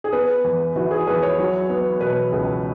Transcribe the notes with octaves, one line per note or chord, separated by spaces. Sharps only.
G#4
B3 B4
E2
E3 F#4
G#4
E2 B4
C#5
F#3
B3
B2 B4
C#2